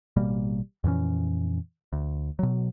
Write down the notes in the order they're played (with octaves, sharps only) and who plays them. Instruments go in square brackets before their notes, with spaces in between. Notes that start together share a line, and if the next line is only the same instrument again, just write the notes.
[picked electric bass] A1 B2 G3 A#3
F2 A#2 E3 C#4
D2
B2 F#3